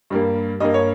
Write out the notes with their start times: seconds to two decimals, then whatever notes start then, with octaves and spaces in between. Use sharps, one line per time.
0.10 G2 G3 A#3
0.60 G2 G3 A#3 D#5
0.74 C#5